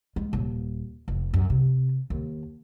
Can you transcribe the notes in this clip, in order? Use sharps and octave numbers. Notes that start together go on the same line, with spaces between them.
G#3
D#1
F1
F#2
C3
D#2